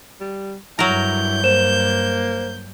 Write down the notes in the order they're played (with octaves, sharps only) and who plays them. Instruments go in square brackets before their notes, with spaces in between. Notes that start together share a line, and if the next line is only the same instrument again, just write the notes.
[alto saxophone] G3
[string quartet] G2 G6 [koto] F#3 A#4 [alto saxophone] E4
[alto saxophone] A#3 [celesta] C5 E7